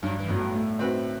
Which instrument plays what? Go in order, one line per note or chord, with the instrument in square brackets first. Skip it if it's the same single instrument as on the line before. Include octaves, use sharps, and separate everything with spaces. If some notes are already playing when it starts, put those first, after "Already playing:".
[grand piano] G2 [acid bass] F#3
[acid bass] E3
[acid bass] G2 [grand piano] F#3 B3
[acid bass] A2
[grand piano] A3
C4 F#4 B4